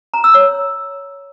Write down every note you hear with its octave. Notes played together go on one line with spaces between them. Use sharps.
A#5
E6
C#5